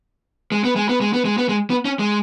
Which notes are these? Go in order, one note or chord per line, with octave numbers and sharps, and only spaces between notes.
G#3
B3
G#3
B3
G#3
B3
G#3
B3
G#3
B3
C#4
G#3